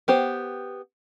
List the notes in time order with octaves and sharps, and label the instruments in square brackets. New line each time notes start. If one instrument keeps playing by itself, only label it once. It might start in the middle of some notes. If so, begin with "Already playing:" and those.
[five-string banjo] B3 G4 C5